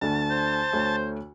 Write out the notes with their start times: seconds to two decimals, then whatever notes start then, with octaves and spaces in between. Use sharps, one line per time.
0.01 D2 D3 A3 A5
0.30 C5
0.73 D2 A3 C#5